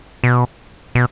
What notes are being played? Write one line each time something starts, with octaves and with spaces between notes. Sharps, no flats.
B2
B2